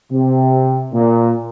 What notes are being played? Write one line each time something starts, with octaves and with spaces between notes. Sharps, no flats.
C3
A#2